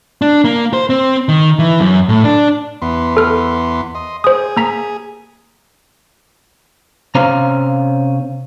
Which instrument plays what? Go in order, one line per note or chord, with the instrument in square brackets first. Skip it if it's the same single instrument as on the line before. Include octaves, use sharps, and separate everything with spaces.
[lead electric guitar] D4
A#3
C5
C4
D#3
E3
F#2
A2
D4
[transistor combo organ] E2 B3 C6
[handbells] A4 F6
[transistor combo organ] D#5 C6
[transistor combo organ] G#4 [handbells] C5 D#6
[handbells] A#3 A#5 B6
[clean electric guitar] C3 C#4 C5 F5 A#5